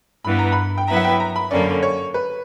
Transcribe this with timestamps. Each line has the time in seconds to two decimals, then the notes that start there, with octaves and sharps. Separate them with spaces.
0.25 G2 E3 B3 B5
0.39 A#5
0.52 B5
0.78 G5
0.88 F#3 B3 E4 B4 E5 A#5
0.96 F#5
1.04 G5
1.20 A#5
1.36 B5
1.51 F#2 D3 A#3 C#4 D5
1.83 C#5
2.14 B4